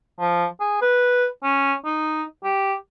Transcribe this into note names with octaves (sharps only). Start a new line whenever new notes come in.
F3
G#4
B4
C#4
D#4
G4